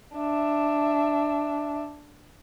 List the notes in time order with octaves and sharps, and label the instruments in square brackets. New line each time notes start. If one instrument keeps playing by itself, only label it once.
[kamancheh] D4 E5